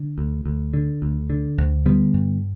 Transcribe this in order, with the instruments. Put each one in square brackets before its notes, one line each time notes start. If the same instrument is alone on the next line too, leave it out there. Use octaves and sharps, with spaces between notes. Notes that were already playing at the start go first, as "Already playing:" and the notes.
Already playing: [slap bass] D3
D2
D2
D3
D2
D3
D2
D3 G3 B3
G2